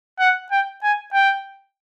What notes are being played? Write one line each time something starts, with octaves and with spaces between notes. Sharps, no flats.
F#5
G5
G#5
G5